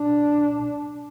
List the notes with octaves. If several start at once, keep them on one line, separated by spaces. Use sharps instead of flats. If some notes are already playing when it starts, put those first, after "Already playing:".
Already playing: D4